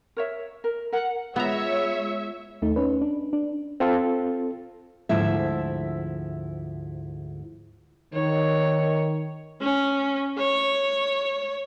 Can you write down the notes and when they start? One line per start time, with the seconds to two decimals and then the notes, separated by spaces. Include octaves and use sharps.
0.17 A#4 C#5 E5
0.64 A#4
0.92 A#4 F#5
1.36 G#3 B3 F4 C#5 E5 A#5
2.62 D#2 A3 D#4
2.76 C#4 D#4 B4
3.01 D4
3.33 D4
3.80 C4 F4 A4
5.09 D2 G#2 F3 E4 E5
8.14 D#3 C#5
9.61 C#4
10.38 C#5